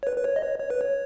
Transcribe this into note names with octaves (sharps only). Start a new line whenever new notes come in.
C#5
B4
B4
C#5
D#5
C#5
C#5
B4
C#5